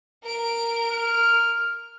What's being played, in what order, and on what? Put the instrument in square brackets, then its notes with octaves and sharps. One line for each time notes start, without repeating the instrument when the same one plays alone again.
[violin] A#4 D7
[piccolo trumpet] F6